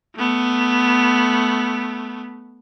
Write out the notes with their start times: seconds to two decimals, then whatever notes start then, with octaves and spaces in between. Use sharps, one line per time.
0.16 A3 B3